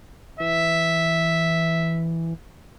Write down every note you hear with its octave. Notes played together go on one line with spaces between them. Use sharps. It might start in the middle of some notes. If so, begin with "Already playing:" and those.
E3 E5